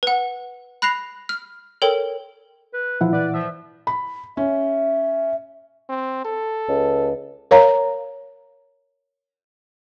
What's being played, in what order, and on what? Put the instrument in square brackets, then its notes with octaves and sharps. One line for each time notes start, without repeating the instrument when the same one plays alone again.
[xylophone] B4 F#5
B5 F#6 A#6 C7 F7
F6
A4 A#4 C#5 G5
[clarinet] B4
[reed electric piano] A#2 E3 F#5 [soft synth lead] F3 [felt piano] E4
[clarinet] B4 [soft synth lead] D5
[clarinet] F3 [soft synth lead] E5
[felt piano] B5
[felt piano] C#4 [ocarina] E5
[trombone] C4
A4
[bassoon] C#2
[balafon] A#4 C#5 F5 A#5